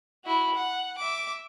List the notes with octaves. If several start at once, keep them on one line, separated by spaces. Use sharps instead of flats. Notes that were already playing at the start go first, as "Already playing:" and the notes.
E4 F#4
F#5
E5 D6